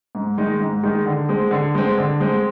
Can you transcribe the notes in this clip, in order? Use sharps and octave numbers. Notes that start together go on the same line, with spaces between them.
G#2
D#3 G#3 D#4
G#2
D#3 G#3 D#4
D3
G#3 C4
D3
G#3 C4
D3
G#3 C4